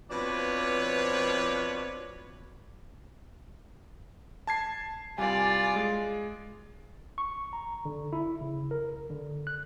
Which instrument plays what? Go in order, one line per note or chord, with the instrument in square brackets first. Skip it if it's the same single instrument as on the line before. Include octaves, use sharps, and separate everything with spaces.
[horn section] B2 F3 C4 D4 B4 C#5
[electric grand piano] A5 G#6 C7
[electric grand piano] C2 G3 G#5 [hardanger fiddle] F4 D5
[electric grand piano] G#3
[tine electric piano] C#6
A#5
D3
E4
C#3
A#4
B1
D3
F#6